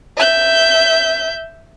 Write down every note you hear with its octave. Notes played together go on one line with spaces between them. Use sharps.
E5 G6